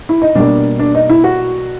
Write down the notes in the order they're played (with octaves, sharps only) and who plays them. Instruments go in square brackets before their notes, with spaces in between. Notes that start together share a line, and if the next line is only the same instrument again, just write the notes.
[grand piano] E4
D#4
B2 G3 A#3 D4
D4
D#4
E4
F#4